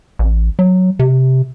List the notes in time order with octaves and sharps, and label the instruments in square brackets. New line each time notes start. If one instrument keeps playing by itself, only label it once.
[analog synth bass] A1
F#3
C3